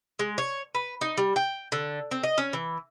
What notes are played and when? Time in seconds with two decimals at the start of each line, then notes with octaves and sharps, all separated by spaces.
0.19 G#3
0.38 C#5
0.75 B4
1.01 D#4
1.17 G3
1.36 G5
1.72 D3
2.11 C4
2.23 D#5
2.38 C#4
2.53 E3